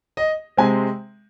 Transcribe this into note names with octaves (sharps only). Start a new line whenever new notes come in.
D#5
C3 G#3 C4 G#5